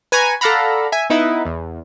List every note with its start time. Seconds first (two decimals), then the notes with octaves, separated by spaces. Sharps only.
0.12 B4 G#5 A#5 C#6
0.41 A4 D5 F5 F#5 A#5 B5
0.92 E5 G#5
1.10 B3 D#4 E4 B4
1.45 E2